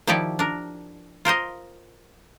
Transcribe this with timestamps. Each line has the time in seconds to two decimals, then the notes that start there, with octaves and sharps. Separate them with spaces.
0.07 D#3 F3 E4 G4 C#5 D5
0.39 D4 A#4
1.25 F4 A#4 C5 D#5